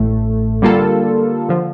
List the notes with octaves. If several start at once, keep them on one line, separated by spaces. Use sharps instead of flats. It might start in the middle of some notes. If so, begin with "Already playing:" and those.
Already playing: A1 A2 A3
D3 G3 A#3 F4 A4
D3 F3